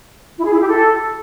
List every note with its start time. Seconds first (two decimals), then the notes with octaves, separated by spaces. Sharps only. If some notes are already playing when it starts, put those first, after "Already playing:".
0.38 E4
0.45 G#4
0.53 E4
0.60 G4
0.68 A4